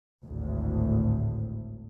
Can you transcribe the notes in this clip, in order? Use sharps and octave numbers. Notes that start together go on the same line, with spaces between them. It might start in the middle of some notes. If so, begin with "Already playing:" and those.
G#1 D2 A2